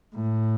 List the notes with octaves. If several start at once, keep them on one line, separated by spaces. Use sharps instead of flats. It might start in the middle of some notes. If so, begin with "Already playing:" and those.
A2